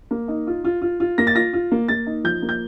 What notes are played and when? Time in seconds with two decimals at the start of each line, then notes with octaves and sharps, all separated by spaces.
0.11 A#3
0.28 D#4
0.47 F4
0.64 F4
0.82 F4
1.00 F4
1.18 A#3 A#6
1.27 A6
1.35 F4 A#6
1.53 F4
1.72 A#3
1.88 A#3 A6
2.07 D#4
2.24 F3 G6
2.42 A#3
2.49 G6